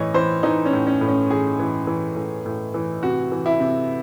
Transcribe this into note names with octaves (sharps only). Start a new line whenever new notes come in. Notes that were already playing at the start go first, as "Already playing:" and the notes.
Already playing: A2 E3 C#5 D#5
E3 C5
E3 D#4
C#4
A2
C#4
A2
C#4
E3 G#4
E3
E3
A2
A2
E3
C3 F#4
E3
E4
C3